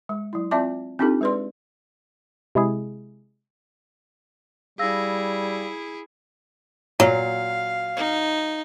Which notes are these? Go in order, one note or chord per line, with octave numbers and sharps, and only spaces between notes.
G#3
F#3 E4
C4 F4 D5 E5 A5 D6
C4 D4 D#4 F4 G4 A4
G#3 G#4 B4 D5 C6
C3 G#3 E4 G#4
G3 E4 G#4 F5 E6 A#6
A#2 F#3 F5
D#4